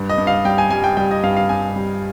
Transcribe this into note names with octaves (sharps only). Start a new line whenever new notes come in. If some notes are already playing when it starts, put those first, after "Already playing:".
Already playing: G2
D#5
G2
F5
G3 G5
G#5
G3 G#5
G5
G3 G5
D#5
G2 F5
F5
G2 G#5
G3